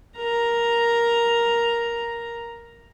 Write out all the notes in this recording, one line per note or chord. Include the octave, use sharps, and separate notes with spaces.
A#4 A#5